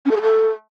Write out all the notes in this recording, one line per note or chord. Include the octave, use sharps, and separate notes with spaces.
C#4
A4
G#4
A4